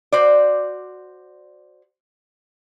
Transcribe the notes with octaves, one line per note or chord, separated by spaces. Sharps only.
F#4 C5 D5